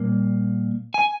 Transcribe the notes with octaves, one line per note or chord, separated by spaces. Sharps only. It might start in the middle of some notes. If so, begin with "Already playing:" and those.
Already playing: A#2 G3 A#3
G#5